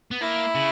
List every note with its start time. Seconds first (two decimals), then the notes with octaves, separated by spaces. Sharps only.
0.11 B3
0.21 A#3 E4
0.55 C#3